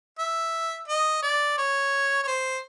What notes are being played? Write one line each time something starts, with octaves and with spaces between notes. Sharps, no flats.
E5
D#5
D5
C#5
C#5
C5